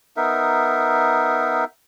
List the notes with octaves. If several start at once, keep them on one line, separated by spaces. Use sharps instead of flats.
B3 D#4 A#4 E5